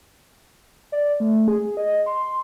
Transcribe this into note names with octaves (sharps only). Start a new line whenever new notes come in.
D5
A3
G#4
D#5
C6